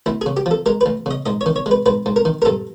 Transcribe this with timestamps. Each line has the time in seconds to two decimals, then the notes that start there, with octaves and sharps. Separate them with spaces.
0.06 D2 E4
0.21 C#3 G#4
0.37 G4
0.46 F3
0.51 A4
0.66 G#3 A#4
0.81 B4
0.86 D2
1.06 C#3 D#5
1.26 G#2 D#5
1.41 C#5
1.46 D#3
1.56 C#5
1.66 G#3
1.71 B4
1.86 G#2 B4
2.06 G#2
2.16 A#4
2.25 D#3
2.42 A#4
2.45 G2 A4